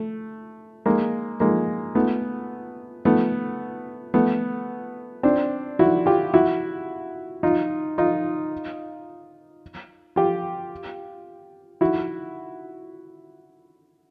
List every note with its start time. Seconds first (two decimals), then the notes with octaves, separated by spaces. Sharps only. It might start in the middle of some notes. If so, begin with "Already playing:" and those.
Already playing: A3
0.86 G#3 A#3
1.40 G#3 A#3
1.95 A3 B3
3.05 A3 B3
4.14 A3 B3
5.23 C4 D4
5.79 E4 F#4
6.06 F4 G4
6.34 E4 F#4
7.43 D#4 F4
7.98 D#4 F4
10.16 F4 G4
11.81 E4 F#4